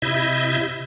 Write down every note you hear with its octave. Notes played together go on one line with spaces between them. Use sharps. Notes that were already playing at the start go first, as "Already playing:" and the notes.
C3 E4 D#5 E5 G6 G#6